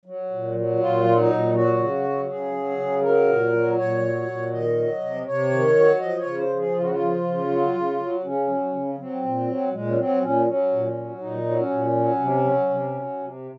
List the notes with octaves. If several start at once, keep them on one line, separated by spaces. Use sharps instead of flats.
F#3
A#2
F#3
A#2 F4
F#3
D#4
A#2
F#3 F#4
C#3
F#3
C#3 G#4
F#3
C#3
F#3 A#4
A#2
F#3
A#2 C#5
F#3
A#2
D#3 D#5
F#3
C3
C3 C#5
D#3
F#3
F3 D#5
C#5
C#3
C5
F3
G#4
C#3 F4
F#4
F4
F3
C#3
F#3
C#3
F#3
C#3 C#4
F#3
C#3
F#3 C4
A#2
F#3
A#2 G#3
C#4
F#3 C4
A#2 C#4
F#3 C#4
A#2
F#3
A#2 D#4
F#3
C#4
A#2
F#3
C3
F#3
C3
F#3
C3